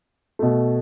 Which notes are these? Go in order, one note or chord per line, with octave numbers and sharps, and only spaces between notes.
B2 A3